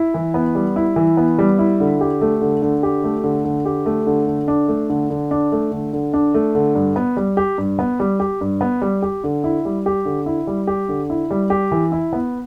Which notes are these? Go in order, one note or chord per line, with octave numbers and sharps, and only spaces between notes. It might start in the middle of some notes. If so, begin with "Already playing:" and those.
Already playing: E4
E3
B3
G3
E4
E3
B3
G3
E4
D3
G4
A3
D3
D3
G4
A3
D3
D3
G4
A3
D3
D3
D4
A3
D3
D3
D4
A3
D3
D3
D4
A3
D3
G2
B3
G3
G4
G2
B3
G3
G4
G2
B3
G3
G4
D3
E4
G3
G4
D3
E4
G3
G4
D3
E4
G3
G4
E3
E4
B3